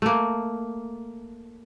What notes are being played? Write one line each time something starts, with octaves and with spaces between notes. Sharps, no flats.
A3 A#3